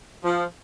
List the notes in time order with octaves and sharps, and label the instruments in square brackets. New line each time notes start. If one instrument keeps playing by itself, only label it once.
[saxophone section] F3